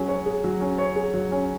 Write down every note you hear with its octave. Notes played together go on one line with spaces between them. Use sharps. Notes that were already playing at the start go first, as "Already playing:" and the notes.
Already playing: F#3 C#4 G#4
C#5
G#4
F#3
C#4
C#5
G#4
F#3
C#4